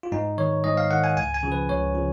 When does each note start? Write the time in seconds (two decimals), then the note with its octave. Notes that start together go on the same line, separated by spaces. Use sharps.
0.03 F4
0.12 G#2 D#4
0.38 D#3 C#5
0.64 G#2 D#5
0.77 F5
0.91 D#3 F#5
1.04 G#5
1.16 C#2 G#5
1.34 G#5
1.43 C#3 F3
1.52 B4
1.69 C#2 C#5
1.95 C#3 F3